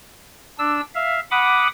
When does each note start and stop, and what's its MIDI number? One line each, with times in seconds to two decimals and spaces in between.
0.58 0.81 62
0.58 0.81 88
0.95 1.20 76
0.95 1.20 77
1.31 1.67 78
1.31 1.67 83
1.31 1.67 86
1.31 1.67 87